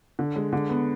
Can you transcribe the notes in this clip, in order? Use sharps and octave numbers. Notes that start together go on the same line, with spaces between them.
D3
G#3
D3
B3